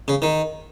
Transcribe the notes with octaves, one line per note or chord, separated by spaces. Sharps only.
C#3
D#3